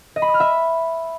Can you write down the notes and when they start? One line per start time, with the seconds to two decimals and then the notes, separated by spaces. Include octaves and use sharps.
0.16 D#5
0.22 B5
0.28 D#6
0.34 F6
0.40 E5